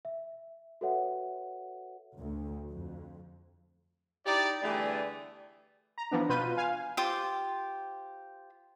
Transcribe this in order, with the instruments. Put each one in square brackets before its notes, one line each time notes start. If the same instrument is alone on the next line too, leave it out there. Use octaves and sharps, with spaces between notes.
[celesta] E5
F#4 A4 B4 C#5 E5 F#5
[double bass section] D2
F2
[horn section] D#4 E4 G4 D5
D3 E3 G3 A3 B3 G#4
[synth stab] A#5
E3 F3 B3 D4
B2 F4 B4 G6 D#7
F5 G#5
[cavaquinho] F4 G4 C5 D6